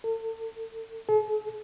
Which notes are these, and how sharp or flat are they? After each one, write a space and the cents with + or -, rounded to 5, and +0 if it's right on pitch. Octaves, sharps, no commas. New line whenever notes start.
A4 +40
A4 -45